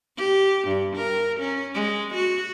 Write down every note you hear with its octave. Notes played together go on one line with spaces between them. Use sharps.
G4
G2
A#4
C#4
G#3
F#4